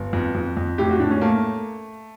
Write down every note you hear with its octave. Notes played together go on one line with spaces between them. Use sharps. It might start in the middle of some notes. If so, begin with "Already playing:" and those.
Already playing: G1
F2
F2
F2
A2 G4
F#4
A2 D4
C#4
A3 A#3